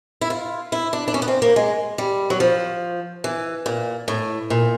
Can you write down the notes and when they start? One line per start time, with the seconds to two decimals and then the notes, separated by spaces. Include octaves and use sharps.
0.21 E4
0.30 F4
0.72 E4
0.93 D4
1.08 D4
1.14 C#4
1.22 B3
1.28 C4
1.42 A#3
1.56 G#3
1.98 G3
2.30 F#3
2.40 F3
3.24 E3
3.66 A#2
4.08 A2
4.50 A#2